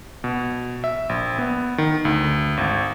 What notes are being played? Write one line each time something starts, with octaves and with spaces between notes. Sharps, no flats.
B2
E5
A#1
B3
D#3
D2
G#1